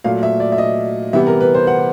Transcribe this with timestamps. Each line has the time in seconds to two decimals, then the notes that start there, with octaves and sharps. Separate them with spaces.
0.04 A#2 F#3 A3 F5
0.23 E5
0.40 D5
0.52 E5
0.58 D#5
1.13 C3 E3 G3 B3 E5
1.27 A#4
1.41 B4
1.55 C5
1.67 F#5